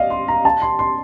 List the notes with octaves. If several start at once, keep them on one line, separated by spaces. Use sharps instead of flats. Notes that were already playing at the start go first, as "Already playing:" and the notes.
Already playing: D5 D#5 F5
C6
A#5
A5
C6
C6